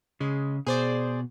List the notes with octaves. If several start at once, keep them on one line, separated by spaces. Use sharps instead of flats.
C#3 G#3
B2 G#4 C5 D5